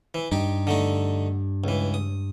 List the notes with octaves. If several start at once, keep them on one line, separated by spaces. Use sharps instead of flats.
E3
G2 D#4 G4
D3 A3 D#4
C#2 E3
D#6